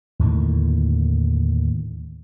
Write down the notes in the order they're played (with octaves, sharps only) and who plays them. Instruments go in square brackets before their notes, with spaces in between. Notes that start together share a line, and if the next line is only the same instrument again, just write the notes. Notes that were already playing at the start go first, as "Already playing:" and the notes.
[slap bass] D#2 A2 D3 D#3